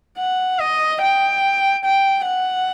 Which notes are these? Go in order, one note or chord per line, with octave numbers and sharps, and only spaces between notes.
F#5
D#5
G5
G5
F#5